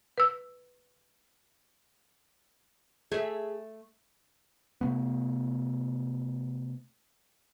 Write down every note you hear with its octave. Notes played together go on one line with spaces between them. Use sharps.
B4 E6
A3 G#4 E5
C3 A3 B3